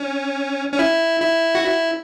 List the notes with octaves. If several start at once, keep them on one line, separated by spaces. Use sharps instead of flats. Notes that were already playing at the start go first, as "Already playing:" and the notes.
Already playing: C#4
C#4
E4
E4
F#4
E4